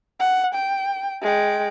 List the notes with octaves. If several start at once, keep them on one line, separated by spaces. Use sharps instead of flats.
F#5
G5
G#3 G5